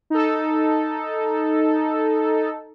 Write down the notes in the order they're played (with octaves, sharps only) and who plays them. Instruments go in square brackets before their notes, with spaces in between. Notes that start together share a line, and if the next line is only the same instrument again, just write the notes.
[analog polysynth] D#4 A4